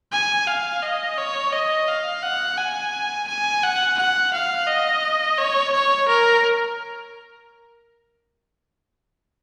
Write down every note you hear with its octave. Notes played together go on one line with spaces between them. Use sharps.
G#5
F5
D#5
C#5
D#5
F5
F#5
G#5
G#5
F#5
F#5
F5
D#5
C#5
C#5
A#4